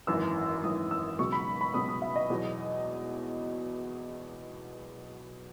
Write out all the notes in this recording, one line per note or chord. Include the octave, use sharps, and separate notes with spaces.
G#1 F#2 E3 E6
G#1 F#2 E3 D#6
E6
C#2 B2 F#3 C#6
B5
B5
C#2 B2 F#3 D#6
D#6
E5
D#5
E2 B2 F#3